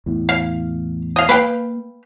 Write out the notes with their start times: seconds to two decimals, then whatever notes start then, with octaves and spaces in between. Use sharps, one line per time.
0.06 E2 A2
0.29 F5
1.16 D#5 F5
1.29 A#3 B4 F5 G5